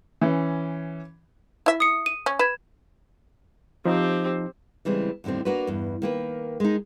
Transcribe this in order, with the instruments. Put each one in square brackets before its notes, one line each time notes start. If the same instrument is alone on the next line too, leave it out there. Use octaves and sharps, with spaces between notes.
[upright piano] E3 C#4
[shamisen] E4 E5
[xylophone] D#6 C7 C#7
D#7
[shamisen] C#4
[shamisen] B4 [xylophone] G#6 E7
[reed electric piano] F3 D#4 [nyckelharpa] C4 G4
[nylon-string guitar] C#3 E3 G3 G#3 C4
D#2 A2 D3 G3 C4
A#3 D4 F#4 A#4 B4
E2 G2
D#3 A#3 B4
G#3 D#4